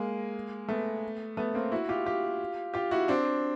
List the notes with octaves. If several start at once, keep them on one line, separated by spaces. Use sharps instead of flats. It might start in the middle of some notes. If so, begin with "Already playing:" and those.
Already playing: G#3 A#3
A3 B3
A3 B3
A#3 C4
E4 F#4
F4 G4
F4 G4
F4 G4
E4 F#4
C4 D4